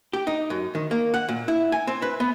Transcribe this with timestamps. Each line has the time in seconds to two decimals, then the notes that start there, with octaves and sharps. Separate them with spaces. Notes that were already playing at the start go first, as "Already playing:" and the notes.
0.13 G4
0.27 D#4
0.50 F#2
0.75 D#3
0.91 A#3
1.14 F#5
1.29 A#2
1.48 E4
1.72 G#5
1.87 C4
2.02 B4
2.20 B3